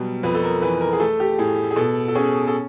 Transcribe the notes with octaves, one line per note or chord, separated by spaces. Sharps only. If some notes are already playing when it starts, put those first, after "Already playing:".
Already playing: B2 F#3 G3
F2 B4
A4
A#4
E3 B4
A#4
G#4
A3 A4
G4
A2 G#4
G#4
B2 A4
A4
C#4 G#4
A4